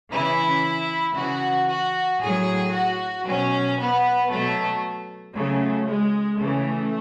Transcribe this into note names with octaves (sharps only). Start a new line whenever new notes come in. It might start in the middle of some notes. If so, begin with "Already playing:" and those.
C#3 E3 E4
C#3 E3 F#4
F#4
A2 F#3 G#4
F#4
B2 F#3 C#4
B3
B2 F#3 A3
C#3 F#3 A3
G#3
C#3 E3 A3